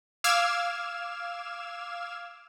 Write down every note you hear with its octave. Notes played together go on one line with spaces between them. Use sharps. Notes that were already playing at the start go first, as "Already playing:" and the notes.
F5 D6 E6 F6 G#6 E7